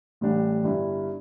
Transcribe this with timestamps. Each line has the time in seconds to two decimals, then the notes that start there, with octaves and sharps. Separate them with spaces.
0.21 A1 A2 G3 D4 G4
0.63 G1 G2 G3 E4